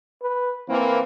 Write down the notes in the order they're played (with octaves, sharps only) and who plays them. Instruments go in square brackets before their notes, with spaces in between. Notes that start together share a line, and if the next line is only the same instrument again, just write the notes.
[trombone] B4
[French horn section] E3 A#3 [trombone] C4